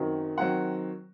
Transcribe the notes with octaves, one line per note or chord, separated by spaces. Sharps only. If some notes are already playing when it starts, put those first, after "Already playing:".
Already playing: F#2 D#3 F#3 C4
D#3 F#3 C4 F#5